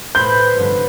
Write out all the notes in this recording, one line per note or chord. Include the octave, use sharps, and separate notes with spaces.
A2 B4 C5 G6
F1 G2 D3